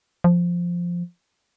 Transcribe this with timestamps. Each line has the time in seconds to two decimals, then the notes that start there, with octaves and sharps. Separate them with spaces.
0.24 F3